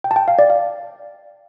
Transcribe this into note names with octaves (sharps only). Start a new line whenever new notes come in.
G5
A5
G5
F5
D5
F5